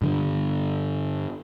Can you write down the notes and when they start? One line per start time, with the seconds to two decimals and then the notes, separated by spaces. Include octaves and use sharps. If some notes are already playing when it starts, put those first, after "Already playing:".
0.02 G2 D3 G3